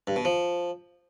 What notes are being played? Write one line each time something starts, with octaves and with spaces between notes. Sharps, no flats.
G2
B2
F3